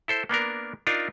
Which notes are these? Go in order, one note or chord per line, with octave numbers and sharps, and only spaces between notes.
E4 A4 C5
A#3 B3 D4 A#4
D4 D#4 F4 A#4